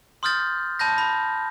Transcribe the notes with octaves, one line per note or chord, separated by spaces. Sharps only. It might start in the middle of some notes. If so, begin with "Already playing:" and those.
C6 D#6 F6 G6 A6
A5 B5 G6 A#6
B5